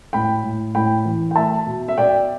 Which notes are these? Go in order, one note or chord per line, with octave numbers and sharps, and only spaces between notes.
A2 G5 B5
A2
A2 G5 B5
E3
G5
A3 E5 A5
B2
E5
B2 D5 G5